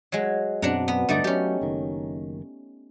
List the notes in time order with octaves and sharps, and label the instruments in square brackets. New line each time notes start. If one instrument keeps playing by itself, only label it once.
[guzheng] F#3 G#3
[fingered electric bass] F#2 B2 C4 [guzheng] D4 F#5 A#5
[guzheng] B3
[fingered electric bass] D1 G2 D3 [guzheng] A3 D#4 D5
[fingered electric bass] F#3 [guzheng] C#4 G4
[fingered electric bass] F#1 D#3